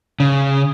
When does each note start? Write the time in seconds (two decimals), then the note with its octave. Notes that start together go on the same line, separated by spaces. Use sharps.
0.20 C#3